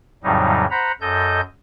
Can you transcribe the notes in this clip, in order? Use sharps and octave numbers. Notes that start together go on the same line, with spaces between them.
F2 A2 C#3 F#3 G3 D#4
C5 F#5 A#5 B5
F#2 A4 D#5 G6